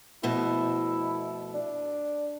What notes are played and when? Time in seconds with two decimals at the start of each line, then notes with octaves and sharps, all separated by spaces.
0.23 F2 B2 A3 E4
1.54 D4